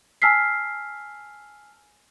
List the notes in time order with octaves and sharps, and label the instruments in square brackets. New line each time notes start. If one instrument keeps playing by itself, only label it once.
[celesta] G#5 A5 E6 F6 B6 C7